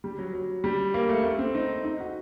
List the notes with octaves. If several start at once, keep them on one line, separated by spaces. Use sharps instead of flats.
G3
F#3
F#3
G3
A#3
A3
A3
C4
D#4
D#4
F#4